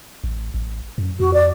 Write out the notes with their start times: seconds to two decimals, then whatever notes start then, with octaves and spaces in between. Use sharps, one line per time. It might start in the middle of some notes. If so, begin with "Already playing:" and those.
0.24 A1
0.54 A1
0.98 F#2
1.20 F2 F#4
1.34 D5